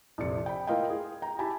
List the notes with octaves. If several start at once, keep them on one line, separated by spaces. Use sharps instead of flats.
A#1 F2 C3 D5 C#7
G5 B5
A#3 E4 F4 D#5 F5 G5
G#4
G5 A#5
E4 G4 G#5 A5 B5